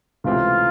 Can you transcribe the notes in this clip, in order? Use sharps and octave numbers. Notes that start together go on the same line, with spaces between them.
C#2 C3 E3 A3 C4 F4